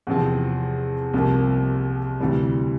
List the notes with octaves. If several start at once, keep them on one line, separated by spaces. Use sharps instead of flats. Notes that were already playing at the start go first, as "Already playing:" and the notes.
E2 C3 F3 C4
C2 C3 F3 A#3
D2 C3 E3 G3